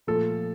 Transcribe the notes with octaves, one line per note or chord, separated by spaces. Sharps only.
A#2 F3 A3 A4